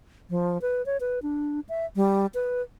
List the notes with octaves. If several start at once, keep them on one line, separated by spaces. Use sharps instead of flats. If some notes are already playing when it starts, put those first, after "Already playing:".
F3
B4
C#5
B4
D4
E5
G3
B4